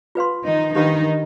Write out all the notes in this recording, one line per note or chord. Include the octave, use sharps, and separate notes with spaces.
F4 B4 F5 C6
D#3 D#4
D#3 D4 D#4 G4 B4 F5 B5